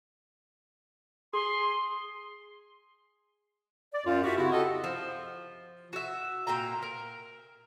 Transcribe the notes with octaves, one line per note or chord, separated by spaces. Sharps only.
G#4 C6
D5
F#2 F4
E4 F#4 G4 E5
C#3 C4 E4 F#4
G4 A4 D#5 F#5
F3
F#4 E5
A#2 F5 G5 A#5
A#4